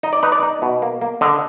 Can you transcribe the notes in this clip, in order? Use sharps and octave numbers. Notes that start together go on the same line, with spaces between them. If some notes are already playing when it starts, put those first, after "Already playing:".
D#4 D#5
D5
D#4 B4
D5
D#4
B2
A#3
A#3
D3 D#5